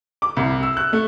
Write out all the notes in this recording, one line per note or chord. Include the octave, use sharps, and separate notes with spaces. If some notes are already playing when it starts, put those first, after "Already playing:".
D6
C2
E6
F#6
A3